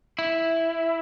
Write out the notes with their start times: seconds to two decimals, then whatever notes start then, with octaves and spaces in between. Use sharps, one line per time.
0.19 E4